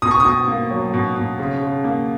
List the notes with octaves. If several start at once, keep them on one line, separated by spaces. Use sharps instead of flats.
B2 D#6
C#6
D#6
B2
A#3
F#3
B2
B2
C#3
C#3
A#3